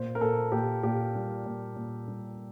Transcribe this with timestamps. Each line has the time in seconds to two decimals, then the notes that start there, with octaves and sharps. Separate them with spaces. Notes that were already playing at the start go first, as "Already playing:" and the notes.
Already playing: A#2 C5
0.15 A#4
0.21 A#2 A4
0.52 A#2 G4
0.83 A#2 G4
1.15 G3
1.46 A#2
1.76 A#2
2.08 G3